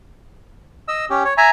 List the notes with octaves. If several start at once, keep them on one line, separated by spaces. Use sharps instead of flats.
D#5 E6
C#4 G4
C#5
E5 G#5 A#5